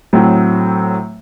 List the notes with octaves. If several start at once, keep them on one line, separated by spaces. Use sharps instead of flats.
A2 F#3 C4